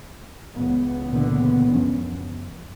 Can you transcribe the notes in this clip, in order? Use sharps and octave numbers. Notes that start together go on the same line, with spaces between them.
C#2 E3 B3
A#2 D3
F#2 F3 C#4